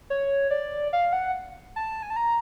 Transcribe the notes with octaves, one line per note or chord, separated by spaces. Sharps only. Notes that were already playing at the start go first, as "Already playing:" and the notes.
C#5
D5
F5
F#5
A5
G#5
A5
A#5